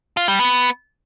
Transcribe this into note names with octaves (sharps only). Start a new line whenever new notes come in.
F4
G3
B3